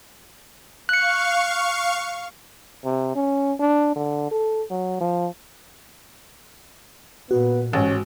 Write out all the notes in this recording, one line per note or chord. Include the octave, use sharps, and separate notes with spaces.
F5 C#6 F#6 C#7
C3
C#4
D4
D3
A4
F#3
F3
A#2 B3 F#4
A1 G#2 C#4